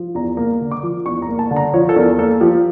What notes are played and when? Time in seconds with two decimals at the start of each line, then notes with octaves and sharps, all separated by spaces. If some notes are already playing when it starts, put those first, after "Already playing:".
Already playing: F3
0.15 E2 A#5
0.37 A#3 A#5
0.61 D3
0.71 D6
0.83 F3
1.06 E2 C#6
1.22 A#5
1.28 A#3
1.39 A5
1.51 D3
1.56 A#5
1.74 F3 C#5
1.89 A4
1.96 E2 A#4
2.18 A#3 A4
2.41 F3 G4